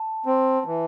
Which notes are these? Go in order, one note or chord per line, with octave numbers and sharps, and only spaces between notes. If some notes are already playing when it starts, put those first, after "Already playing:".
Already playing: A5
C4
E3